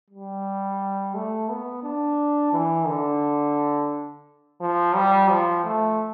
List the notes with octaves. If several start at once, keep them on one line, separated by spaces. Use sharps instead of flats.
G3
A3
B3
D4
E3
D3
F3
G3
F3
A3